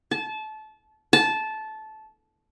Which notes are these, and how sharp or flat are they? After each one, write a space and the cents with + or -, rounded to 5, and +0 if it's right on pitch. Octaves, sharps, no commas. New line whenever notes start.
A5 -25
A5 -15